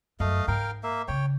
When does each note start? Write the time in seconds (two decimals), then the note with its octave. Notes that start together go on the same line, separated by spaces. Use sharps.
0.20 F#2 A3 D#5 F5
0.48 G#2 A#4 F5 G5
0.83 A#3 E5
1.08 C#3 C#5 G5